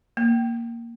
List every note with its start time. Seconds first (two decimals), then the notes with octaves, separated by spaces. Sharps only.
0.17 A#3